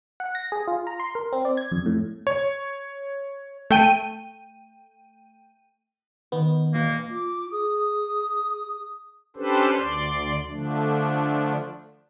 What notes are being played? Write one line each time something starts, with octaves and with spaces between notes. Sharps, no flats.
F#5
A#6
G#4
F4
A#5
C6
A#4
C4
D5
G#6
F2
A2
C#5
A3 G5 D#7
D#3 B3
E1 A#3 F#4 C#7
F4 D6
G#4 D#6
C#4 D4 G4 A4 B4 C5
D2 D5 C6
D3 F3 A3 D4